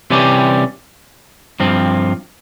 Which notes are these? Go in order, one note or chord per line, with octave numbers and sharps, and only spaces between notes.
C3 E3 G3 C#4 G4
G2 F3 C4